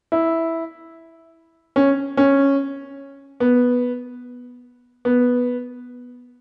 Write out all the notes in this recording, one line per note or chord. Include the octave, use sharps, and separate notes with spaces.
E4
C#4
C#4
B3
B3